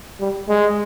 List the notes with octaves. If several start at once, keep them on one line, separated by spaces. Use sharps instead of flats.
G3
G#3